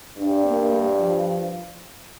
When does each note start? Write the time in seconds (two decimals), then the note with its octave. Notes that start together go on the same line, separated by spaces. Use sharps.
0.17 G2 D4
0.46 A#3
0.74 G3
1.01 F3